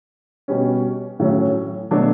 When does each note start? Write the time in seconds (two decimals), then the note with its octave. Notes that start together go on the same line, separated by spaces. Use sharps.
0.48 B2 G3 C#4
1.20 A2 F#3 C#4
1.91 B2 F#3 A3 D4